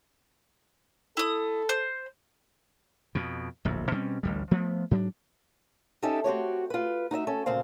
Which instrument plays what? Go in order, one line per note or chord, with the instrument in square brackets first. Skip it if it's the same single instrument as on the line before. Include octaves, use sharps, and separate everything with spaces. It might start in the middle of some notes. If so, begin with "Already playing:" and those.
[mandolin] E4 D#6 [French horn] A4
[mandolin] C5
[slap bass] F2 B2
D1 A#1 F2
B2 G3 C4 C#4
A1 D2 G3
F3 A3 B3
G#2 F#3 D4
[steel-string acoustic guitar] C#4 D#4 G4 A4 E5
C4 F#4 G4 C#5
F4 B4
D#4 F#4 D#5 E5
C#4 A4
D2 A#2 C#3 C4 C5 F5